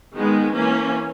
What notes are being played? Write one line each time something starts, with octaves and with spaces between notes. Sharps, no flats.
D#3 G#3 B3
E3 A#3 C#4